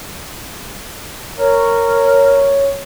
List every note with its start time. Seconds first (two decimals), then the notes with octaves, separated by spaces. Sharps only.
1.37 A#4 C#5